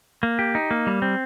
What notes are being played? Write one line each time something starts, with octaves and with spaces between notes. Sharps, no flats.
A#3
G4
D#4
A#3
G3
C4